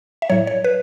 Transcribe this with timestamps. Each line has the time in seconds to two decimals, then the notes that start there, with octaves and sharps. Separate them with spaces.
0.22 E5
0.30 A2 F#3 C#5
0.47 C#5
0.64 B4